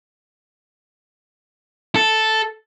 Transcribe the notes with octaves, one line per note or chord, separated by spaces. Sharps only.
A4